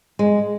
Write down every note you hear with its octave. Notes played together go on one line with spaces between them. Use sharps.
G#3